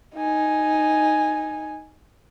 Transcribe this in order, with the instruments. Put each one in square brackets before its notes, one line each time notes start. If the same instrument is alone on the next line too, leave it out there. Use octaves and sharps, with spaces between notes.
[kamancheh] D#4 G#5